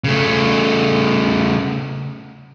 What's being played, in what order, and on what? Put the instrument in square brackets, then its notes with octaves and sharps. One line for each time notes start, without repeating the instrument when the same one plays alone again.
[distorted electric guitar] C#3 A3